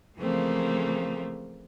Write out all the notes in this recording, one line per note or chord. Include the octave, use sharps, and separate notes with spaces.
C#3 E3 F3 A3 A#3 C4